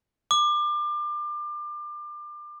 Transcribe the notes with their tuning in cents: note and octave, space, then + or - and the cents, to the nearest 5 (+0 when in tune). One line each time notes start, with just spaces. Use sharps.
D6 +30